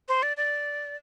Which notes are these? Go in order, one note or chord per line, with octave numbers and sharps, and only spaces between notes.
C5
D5
D5